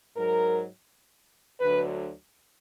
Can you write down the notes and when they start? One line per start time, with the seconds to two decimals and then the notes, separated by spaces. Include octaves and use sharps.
0.16 G#2 F#3 A#4
1.61 D2 D3 F#3 B4